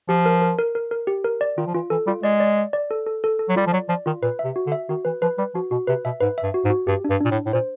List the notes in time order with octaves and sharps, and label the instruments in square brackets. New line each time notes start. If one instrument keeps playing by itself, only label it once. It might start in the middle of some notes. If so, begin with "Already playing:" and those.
[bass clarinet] F3 [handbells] G4
[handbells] A#4
A#4
A#4
A#4
A#4
G4
A#4
D5
[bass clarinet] D#3 [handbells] F4
[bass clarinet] F3
[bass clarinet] E3 [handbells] F4
[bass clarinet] E3 [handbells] A4
[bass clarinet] G3 [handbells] F4
[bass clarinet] G#3 [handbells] D5
[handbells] D5
D5
D5
A4
A4
A4
A4
[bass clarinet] F#3
[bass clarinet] G3 [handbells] F4
[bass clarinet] F3
[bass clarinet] F#3 [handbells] D5
[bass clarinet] F3 [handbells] D5
[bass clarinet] D#3 [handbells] F4
[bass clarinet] A#2 [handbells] B4
[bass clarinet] C3 [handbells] E5
[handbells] F#4
[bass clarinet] D3
[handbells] E5
[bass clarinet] D#3 [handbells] F#4
[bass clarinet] E3 [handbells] B4
[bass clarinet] F3 [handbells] B4
[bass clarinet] G3 [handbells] B4
[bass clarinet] F3 [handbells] F#4
[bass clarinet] B2 [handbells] F#4
[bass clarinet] C3 [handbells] B4
[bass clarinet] B2 [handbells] E5
[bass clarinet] G#2 [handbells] B4
[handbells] E5
[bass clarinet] G2
[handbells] F#4
[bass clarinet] G#2
[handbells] F#4
[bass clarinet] G2 [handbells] G4
[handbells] D4
[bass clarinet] G2
[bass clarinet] A#2 [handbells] D4
[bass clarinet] A2
[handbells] D4
[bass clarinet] A2
[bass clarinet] A#2 [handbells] C5